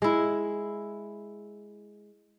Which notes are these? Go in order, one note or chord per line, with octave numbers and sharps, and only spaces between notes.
G#3 E4